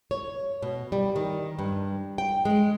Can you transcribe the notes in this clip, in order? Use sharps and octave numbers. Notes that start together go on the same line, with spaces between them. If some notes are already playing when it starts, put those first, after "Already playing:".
C#5
B2
G3
D#3
G2
G5
G#3